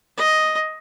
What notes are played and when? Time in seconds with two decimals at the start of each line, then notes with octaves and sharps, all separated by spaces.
0.17 D#5